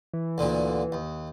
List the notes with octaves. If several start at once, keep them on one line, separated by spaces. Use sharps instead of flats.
E3
D2 A#2 D3
D#2